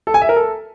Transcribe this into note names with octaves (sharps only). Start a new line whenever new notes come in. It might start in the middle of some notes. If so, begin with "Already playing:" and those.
A4
G#5
E5
A#4
A4